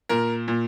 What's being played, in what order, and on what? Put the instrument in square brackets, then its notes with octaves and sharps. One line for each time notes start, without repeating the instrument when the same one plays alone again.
[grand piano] A#2 A#4
A#2